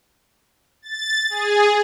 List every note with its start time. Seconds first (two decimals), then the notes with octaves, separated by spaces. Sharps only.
0.82 A6
1.30 G#4